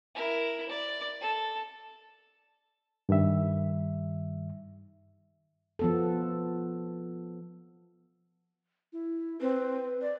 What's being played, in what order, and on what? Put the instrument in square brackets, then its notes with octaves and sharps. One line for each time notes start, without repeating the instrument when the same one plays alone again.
[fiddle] E4 A#4
D5
A4
[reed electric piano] G2 D#3 G3 E5
[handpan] F3 B3 A4
[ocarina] E4
[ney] C4 [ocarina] B4
[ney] D5